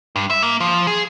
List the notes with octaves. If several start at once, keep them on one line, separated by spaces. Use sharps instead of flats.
G2
E5
A#3
F3
G#4